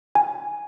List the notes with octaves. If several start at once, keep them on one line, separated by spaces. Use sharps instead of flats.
G#5